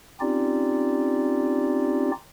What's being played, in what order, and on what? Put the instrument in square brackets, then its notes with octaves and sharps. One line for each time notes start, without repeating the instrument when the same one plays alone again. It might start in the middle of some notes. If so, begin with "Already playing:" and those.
[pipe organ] C4 C#4 D#4 F4 G4 D5